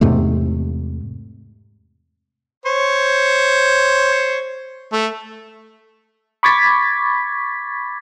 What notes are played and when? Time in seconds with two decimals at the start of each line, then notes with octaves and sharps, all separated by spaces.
0.01 E2 G#2 C3 A3
2.66 C5 C#5
4.92 A3
6.43 B5 C#6 D6 G#6 A6 B6